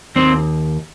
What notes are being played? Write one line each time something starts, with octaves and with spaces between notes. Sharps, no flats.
D#2 C4